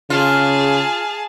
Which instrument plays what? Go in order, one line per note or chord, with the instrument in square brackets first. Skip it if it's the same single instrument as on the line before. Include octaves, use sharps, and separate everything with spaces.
[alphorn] C#3 [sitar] F4 [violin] G#4 A5